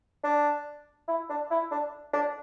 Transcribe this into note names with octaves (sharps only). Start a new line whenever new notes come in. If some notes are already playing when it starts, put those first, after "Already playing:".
D4
E4
D4
E4
D4
D4